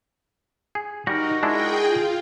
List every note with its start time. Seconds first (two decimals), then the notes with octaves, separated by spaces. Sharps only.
0.75 G#4
1.07 G3 D#4 F#4 A#4
1.43 G#3 D4 E4 G#4 G5
1.85 F4